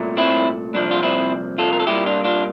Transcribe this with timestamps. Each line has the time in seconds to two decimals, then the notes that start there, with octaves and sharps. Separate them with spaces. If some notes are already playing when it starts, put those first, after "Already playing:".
Already playing: C2 A#2 A3
0.17 C4 E4
0.74 C2 A#2 F3 D4
0.91 F4
1.02 C4 E4
1.58 F4 A4
1.73 A#4
1.80 A4
1.87 C2 A#2 G3 A#3 E4 G4
2.06 D4 F4
2.24 D4 F4